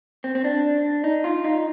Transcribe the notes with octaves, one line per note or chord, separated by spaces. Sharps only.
C4
C4
D4
D#4
F4
D#4